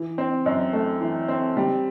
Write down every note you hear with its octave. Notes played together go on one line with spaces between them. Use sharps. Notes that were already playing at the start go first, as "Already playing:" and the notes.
Already playing: E3
C4
F#2
A3
E3
C4
G3